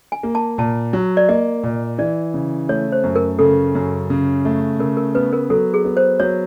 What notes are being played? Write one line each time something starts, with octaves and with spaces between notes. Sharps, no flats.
G#5
A#3
A5
A#2 A5
F#3
D5
A#3 D#5
A#2
E3 D5
C#3
A3 C#5
C5
F#2
A#4
C#3 A4
F#2
C#3
A3
C#3 A#4
A#4
B3 B4
A#4
F#3 A4
G#4
B3
C5
F#3 C#5